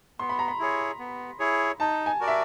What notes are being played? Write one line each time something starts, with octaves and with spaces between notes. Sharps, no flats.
B3 C6
B5
A#5
B5
E4 G#4 C#5
B3
E4 G#4 C#5
D#4 A5
G#5
F#4 A#4 D5
E5